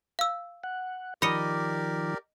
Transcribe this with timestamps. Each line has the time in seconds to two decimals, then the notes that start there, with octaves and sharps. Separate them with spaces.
0.19 F5 E6
0.64 F#5
1.22 D#3 F3 G4 A#4 D5 D#5 B5 C#7